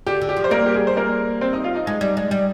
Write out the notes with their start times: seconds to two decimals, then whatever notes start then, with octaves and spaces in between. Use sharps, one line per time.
0.06 D3 G4
0.21 D3
0.29 G4
0.36 F3
0.44 C5
0.51 G3 A#3 A#4
0.66 G4
0.74 G#4
0.87 C5
0.97 A#3 A#4
1.41 C4 C5
1.53 D#4 D#5
1.64 F4 F5
1.75 D#4 D#5
1.86 G#3 D#4 D#5
2.01 G3
2.17 G#3
2.31 G3